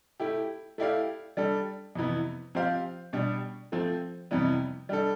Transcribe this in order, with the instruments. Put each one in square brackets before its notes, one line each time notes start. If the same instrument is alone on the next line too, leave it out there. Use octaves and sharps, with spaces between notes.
[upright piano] A3 E4 G4
A3 E4 G4 D5 F5
G3 D4 A4
F2 C3 E3 B3
F3 C4 G4 C5 F5
B2 G3 D4
F3 A3 C4
F2 C3 E3 G3 B3
G3 D4 A4